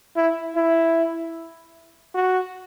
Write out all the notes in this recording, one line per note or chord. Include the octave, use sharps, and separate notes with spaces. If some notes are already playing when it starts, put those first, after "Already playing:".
E4
E4
F#4